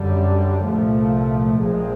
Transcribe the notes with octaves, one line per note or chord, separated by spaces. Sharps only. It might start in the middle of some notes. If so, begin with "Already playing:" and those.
Already playing: F#2 D3 G3
C2 A#2 F3 A3
A#1 A#2 F3 G#3 C4